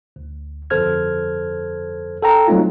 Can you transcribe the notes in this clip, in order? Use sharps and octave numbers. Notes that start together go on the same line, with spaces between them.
D2
G1 F2 A4 C5 F6 G#6
A4 G5 A#5
F#3 G3 A3 C4 D#4 F4